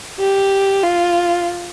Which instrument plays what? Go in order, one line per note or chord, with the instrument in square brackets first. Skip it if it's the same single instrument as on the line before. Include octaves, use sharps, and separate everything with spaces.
[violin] G4
F4